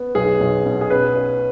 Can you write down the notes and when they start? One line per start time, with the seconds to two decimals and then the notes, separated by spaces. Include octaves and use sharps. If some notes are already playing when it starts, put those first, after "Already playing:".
Already playing: B3
0.15 B1 G#4
0.40 B1
0.65 B2
0.81 G#4
0.90 C#4 B4
1.16 C#4